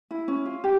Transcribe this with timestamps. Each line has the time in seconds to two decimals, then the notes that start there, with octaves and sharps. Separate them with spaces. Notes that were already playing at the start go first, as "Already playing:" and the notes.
0.11 E4
0.28 C#4
0.45 F4
0.64 G4